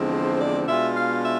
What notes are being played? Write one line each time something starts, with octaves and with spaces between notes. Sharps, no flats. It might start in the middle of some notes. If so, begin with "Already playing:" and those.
Already playing: E2 D3 F3 G#3 C4
C5
C5
D5
B2 G#3 D4 F4 E5
F5
E5